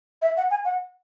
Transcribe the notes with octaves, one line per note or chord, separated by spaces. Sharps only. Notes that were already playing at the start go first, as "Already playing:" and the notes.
E5
F#5
G#5
F#5